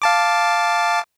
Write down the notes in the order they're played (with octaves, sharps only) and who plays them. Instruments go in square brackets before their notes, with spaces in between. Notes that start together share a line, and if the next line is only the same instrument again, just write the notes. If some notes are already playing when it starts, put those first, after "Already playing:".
[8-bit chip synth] F5 A5 D6